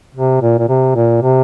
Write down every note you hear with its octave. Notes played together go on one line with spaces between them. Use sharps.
C3
A#2
A#2
C3
A#2
C3